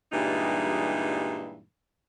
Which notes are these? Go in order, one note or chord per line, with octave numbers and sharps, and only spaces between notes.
G2 A#2 E3 G3 G#3 D#4